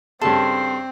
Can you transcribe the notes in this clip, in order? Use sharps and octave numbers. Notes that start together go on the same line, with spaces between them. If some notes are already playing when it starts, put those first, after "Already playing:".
G2 C#3 C4 A4 A5 C6